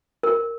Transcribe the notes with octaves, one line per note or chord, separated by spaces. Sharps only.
A#4